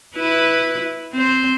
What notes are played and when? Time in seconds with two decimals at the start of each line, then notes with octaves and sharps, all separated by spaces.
0.16 E4 B4
1.13 C4 C5